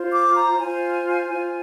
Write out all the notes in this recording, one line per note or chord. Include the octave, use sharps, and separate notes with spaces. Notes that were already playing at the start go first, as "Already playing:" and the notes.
Already playing: F4 C5
D6
A#5
F4 C5 G#5
F4 C5